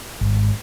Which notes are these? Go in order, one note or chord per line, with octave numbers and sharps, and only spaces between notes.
G#1